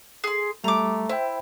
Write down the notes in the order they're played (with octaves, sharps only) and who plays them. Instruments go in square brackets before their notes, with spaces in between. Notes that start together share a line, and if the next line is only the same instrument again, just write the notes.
[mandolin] G#4 C6
[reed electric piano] G3 [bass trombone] A3 [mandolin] A#5 D6
[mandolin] E4 [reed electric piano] C5 E5 G5